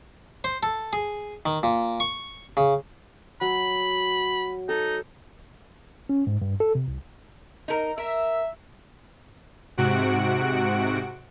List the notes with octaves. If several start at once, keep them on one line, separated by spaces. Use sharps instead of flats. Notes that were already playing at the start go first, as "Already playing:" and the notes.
C5
A4
G#4
D#3
A#2
C#6
C#3
F#3 B5
D#4 A4
C#4
G#2
G2
A4
C3
C2
D#4 A#4
A#4 E5
G#2 C3 F#4 F#5 D7